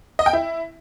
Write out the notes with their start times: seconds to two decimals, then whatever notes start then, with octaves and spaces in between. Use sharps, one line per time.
0.19 D#5
0.26 G5
0.33 E4